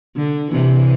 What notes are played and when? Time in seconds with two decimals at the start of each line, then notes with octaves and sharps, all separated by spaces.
0.16 D3
0.51 C3 E3